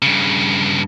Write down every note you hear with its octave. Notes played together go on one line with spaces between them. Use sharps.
G2 C#3